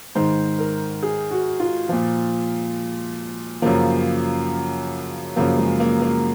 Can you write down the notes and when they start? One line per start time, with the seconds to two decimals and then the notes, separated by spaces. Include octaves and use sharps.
0.15 G#2 D#3 C5
0.58 A#4
1.02 G#4
1.31 F#4
1.60 F4
1.89 A#2 F3
3.62 F#2 C#3 F3 A#3
5.36 F#2 C#3 F3 A#3
5.58 G#3
5.80 A#3
6.02 A#3